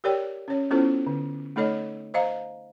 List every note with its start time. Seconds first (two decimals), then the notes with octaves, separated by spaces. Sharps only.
0.04 G4 A#4 C#5 D5 G5
0.48 C#4 C#5
0.71 B3 C#4 E4 F4 A4 C5
1.07 D3
1.56 A3 D#4 A4 C#5 D#5
2.14 C5 D#5 F5 A#5